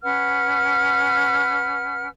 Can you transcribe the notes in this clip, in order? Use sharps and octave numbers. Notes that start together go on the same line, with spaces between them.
C#4 B4 F#5 F6